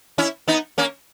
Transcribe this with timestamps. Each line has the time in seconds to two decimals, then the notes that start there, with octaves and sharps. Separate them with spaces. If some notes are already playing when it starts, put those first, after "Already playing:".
0.18 C#4 E4
0.48 B3 D#4
0.78 A#3 C#4